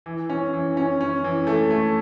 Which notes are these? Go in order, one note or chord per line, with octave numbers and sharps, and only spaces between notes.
E3
C#4
E3
C#4
C#4
E3
A3
A3